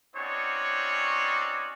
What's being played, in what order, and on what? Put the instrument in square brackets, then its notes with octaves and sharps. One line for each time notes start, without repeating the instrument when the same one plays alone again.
[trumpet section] C4 C#4 D#4 F#4 C#5 D5